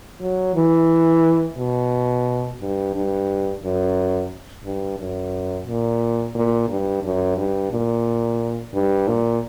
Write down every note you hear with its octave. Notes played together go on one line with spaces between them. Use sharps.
F#3
E3
B2
G2
G2
F#2
G2
F#2
A#2
A#2
G2
F#2
G2
A#2
G2
A#2